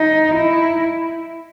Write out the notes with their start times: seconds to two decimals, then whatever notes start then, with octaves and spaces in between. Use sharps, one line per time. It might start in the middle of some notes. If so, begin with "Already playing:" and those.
Already playing: D#4
0.35 E4